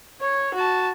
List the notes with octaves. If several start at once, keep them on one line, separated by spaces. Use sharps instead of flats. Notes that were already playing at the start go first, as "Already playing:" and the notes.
C#5
F#4 A5